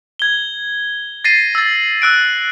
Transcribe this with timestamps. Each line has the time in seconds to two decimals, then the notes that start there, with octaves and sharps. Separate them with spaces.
0.19 G#6 G7
1.24 A6 A#6 C7 D#7
1.55 E6 A6
2.02 E6 F#6 D7